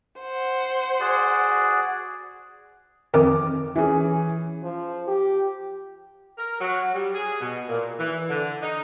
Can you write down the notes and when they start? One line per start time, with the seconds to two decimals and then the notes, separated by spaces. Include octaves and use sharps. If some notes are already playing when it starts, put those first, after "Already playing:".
0.21 C5 F#5
1.00 F#4 G#4 D5
3.14 F2 D#3 D6
3.75 E3 C#4 G#4
4.63 F3
5.07 G4
6.38 A#4
6.60 F#3
6.95 G3
7.14 G#4
7.41 B2
7.68 A#2
8.00 E3
8.30 D3
8.62 D#4